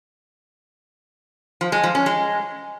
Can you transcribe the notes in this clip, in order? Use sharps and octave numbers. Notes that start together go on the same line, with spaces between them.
F3
G#3
F3
C#4
G#3